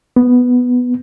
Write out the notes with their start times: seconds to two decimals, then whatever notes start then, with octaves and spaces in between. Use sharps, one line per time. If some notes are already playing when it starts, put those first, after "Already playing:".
0.16 B3